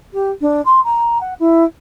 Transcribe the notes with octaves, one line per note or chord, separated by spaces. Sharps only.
G4
D4
C6
A#5
F#5
E4